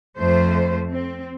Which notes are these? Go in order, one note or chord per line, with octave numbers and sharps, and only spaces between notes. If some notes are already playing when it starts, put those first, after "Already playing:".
F2 A3 C5
C4